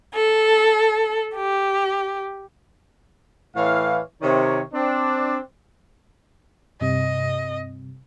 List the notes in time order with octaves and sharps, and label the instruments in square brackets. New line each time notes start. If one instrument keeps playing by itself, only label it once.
[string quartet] A4
G4
[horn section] A2 E3 C#5 F5
C3 D#3 C#5
C4 D4
[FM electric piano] G2 C3 [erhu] D#5